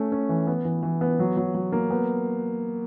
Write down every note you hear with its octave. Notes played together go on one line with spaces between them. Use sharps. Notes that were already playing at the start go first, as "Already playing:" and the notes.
Already playing: A3 C#4
C#4
E3
B3
E3
E3
B3
F#3
F#3
F#3
A#3
B3